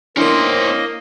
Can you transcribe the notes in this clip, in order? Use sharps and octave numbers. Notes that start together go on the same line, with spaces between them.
A#3 C#4 D4 E4 A#4 C5 D#5